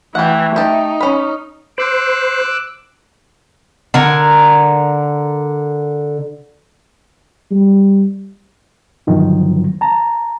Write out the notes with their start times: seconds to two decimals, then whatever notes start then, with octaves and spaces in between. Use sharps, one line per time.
0.15 E3 A3 G4 F#5
0.56 D#4 G4 A5
1.01 C#4 B5
1.78 C5 D6 E6 F#6
3.94 D3 A#4 G#5
7.51 G3
9.07 G2 D3 D#3 F3 F#3
9.81 A5 A#5